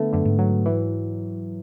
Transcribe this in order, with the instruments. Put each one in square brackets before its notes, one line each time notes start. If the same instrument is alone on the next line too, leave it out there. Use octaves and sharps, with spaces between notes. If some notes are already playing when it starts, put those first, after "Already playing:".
Already playing: [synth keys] D3 A3 B3
[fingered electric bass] F#2 [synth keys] D3
[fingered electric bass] G#2
[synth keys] F#3
E3